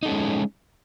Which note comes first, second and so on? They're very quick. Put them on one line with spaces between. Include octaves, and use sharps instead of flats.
D#4 A4 C#4 G#3